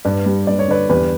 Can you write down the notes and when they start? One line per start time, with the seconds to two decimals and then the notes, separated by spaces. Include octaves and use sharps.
0.05 G2 B4 D5
0.26 G3
0.47 G2 D5
0.59 C#5
0.68 D3 B4 D5
0.89 E2 G4 B4